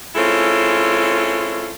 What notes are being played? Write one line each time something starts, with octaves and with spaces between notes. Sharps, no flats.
G#3 C4 C#4 E4 F4 A4